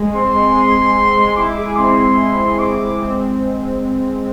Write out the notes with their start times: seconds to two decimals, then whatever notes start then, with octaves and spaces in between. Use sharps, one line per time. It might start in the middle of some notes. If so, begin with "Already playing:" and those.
Already playing: G#3 G#4
0.13 C4 C6
0.33 G#3
0.54 G#4
0.75 G#3
0.96 C4
1.16 G#3
1.37 E4 D6
1.57 G#4
1.78 C4 C6
1.98 G#3
2.19 E4
2.40 G#4
2.59 C4 D6
2.81 G#3
3.01 C4